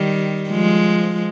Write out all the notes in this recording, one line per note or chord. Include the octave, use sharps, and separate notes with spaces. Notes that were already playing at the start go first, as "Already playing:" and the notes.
Already playing: D#3 G3
F3 G#3